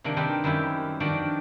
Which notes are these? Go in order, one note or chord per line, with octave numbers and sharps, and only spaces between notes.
C3 D#3 A#3 D4
D#3 G3 C4 G4 A#4 B4
F#2 D#3 G3 E4 G4
D#3 F3 D4 F#4 G4 D5